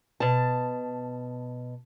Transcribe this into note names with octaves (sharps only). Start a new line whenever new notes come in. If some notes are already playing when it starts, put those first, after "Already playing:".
B2 A5